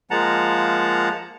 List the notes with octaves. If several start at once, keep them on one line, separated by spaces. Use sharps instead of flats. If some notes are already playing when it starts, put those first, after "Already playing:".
F3 G#3 A#3 F#5 A5 A#5